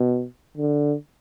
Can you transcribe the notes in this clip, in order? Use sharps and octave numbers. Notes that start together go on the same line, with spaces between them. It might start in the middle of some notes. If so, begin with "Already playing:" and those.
Already playing: B2
D3